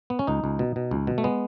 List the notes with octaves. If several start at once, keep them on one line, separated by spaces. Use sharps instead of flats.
B3
C#4
C#2 D#4
C#2
B2
B2
C#2
B2
A3
G#3 B3